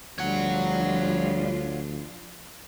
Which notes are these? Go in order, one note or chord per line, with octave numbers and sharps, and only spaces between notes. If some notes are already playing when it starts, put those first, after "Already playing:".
D2 F3 G3 D4 F4 C#5 F#5